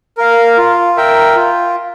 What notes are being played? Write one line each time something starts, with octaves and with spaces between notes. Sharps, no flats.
A#4 F5
F4
A#4 E5 G5
F4